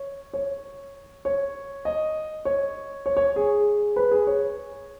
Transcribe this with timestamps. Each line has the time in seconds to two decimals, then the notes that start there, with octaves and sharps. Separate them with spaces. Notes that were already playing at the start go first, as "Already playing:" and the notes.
Already playing: C#5
0.34 C#5
1.25 C#5
1.85 D#5
2.45 C#5
3.06 C#5
3.17 C#5
3.36 G#4
3.96 B4
4.11 G#4
4.27 C#5